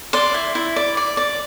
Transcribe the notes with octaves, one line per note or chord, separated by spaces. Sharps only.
D5 C6
E4
E4
D5
D5
D5